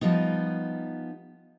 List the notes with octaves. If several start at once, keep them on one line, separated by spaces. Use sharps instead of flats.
F3 G3 B3 D#4